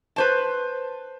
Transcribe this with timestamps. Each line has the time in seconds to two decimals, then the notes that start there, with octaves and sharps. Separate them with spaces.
0.16 B4 C5 A5